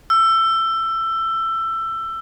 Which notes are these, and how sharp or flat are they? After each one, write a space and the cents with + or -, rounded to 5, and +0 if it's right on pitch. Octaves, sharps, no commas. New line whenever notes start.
E6 +20